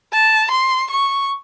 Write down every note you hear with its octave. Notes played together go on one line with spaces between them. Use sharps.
A5
C6
C#6